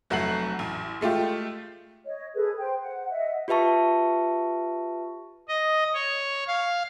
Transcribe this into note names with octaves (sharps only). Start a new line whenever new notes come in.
F1 F#3 A3 F#5 C7 F#7
A1
G#3 A3 F4 G4
C#5 D#5
G#4 A4 B4
C5 G5
F#5
D#5 E5 F#5
F4 G4 B4 E5 A5 C#6
D#5
C#5
F5